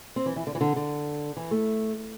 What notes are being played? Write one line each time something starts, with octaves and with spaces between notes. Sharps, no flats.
C4
E3
E3
D3
E3
D3
D3
E3
A3